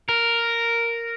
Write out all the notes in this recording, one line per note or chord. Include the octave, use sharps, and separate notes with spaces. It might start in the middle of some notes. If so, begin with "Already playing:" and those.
A#4